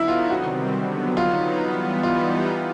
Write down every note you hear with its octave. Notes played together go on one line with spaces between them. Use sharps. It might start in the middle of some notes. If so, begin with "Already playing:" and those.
Already playing: D3 F#3 B3 D#4 E4
F4
C3 D#3 G3 C4 F#4
D3 F#3 B3
F#3 B3 D#4 F4
E3 G3 B3
E3 G3 B3 D#4 F4